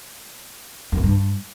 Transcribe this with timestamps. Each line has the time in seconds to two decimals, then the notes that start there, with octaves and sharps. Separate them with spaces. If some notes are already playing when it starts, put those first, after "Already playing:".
0.92 F#2
0.98 C3
1.03 G2